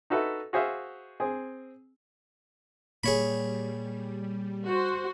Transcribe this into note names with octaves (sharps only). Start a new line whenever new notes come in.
D#4 F#4 A4 B4 E5
F#4 G#4 C5 E5 F5
C4 G#4 G#5
A#2 G3 A#3 G#4 C#5 B5
F#4 C5